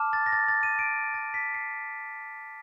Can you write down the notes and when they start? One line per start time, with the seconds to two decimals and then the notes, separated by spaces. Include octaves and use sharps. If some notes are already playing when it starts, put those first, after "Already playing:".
Already playing: A5 D6 F6
0.13 A6
0.26 A#6
0.32 A6
0.48 A6
0.63 D#7
0.79 D7
1.14 A6
1.34 B6
1.54 C7